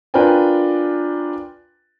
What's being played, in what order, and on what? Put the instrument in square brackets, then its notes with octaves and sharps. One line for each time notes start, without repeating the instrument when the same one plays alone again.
[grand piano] D4 F4 A#4 B4 G5 G#5